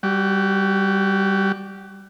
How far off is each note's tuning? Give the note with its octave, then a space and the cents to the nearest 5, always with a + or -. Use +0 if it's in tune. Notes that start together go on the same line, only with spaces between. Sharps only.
G3 +0 F#4 +25